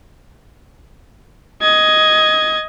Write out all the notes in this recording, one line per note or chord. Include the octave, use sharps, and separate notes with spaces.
D#5 G#6